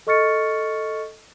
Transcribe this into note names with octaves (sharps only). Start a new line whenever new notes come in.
A4 D#5 C#6 F6 A6 C#7